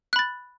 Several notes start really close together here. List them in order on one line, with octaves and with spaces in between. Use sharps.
F#6 B5 A6